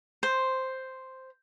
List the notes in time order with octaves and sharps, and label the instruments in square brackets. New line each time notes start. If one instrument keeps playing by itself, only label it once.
[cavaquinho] C5